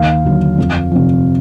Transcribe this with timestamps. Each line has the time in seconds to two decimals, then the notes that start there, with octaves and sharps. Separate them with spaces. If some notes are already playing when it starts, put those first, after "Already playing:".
Already playing: D#2 F5
0.25 D3 F#3
0.58 F2
0.91 C3 F3